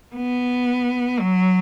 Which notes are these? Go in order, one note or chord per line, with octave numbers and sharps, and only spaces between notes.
B3
F#3